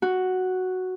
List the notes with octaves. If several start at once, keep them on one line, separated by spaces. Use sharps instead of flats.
F#4